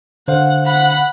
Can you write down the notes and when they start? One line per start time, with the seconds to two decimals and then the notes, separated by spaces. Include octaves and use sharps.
0.28 D3 C5 F5 F#5
0.65 F#5 B5